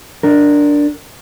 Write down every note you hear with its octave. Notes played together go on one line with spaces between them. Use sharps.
D4 A#4